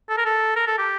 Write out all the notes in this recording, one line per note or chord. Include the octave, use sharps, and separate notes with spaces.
A4
A#4
A4
A#4
A4
G4